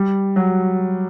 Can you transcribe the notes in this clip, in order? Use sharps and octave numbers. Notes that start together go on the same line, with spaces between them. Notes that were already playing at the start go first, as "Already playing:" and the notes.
Already playing: G3
F#3